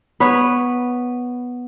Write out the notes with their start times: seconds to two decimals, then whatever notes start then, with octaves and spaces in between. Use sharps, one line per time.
0.20 B3 B4 C#5